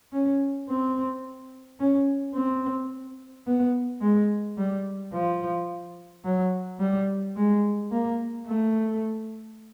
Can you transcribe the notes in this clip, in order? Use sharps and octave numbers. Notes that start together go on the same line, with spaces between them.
C#4
C4
C#4
C4
B3
G#3
G3
F3
F#3
G3
G#3
A#3
A3